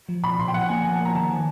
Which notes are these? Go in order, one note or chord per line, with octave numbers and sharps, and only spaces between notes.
F3
A#2 B5
A#2 C6
G5
F3 F#5
A#3 G#5
F3 G#5
A5
A#3
A#5
D#3 A5
D#3 G#5